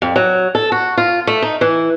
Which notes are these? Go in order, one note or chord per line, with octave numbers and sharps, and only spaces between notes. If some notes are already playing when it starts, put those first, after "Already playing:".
F2
F#3
A4
F#4
F4
A3
D#4
E3